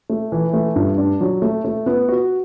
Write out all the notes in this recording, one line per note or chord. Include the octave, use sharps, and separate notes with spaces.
A3
E3
A3
G2
D4
F#3
A3
A3
B3
F#4